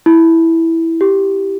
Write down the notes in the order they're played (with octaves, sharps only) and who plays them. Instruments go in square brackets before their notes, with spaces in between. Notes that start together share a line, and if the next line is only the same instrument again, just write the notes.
[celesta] E4
G4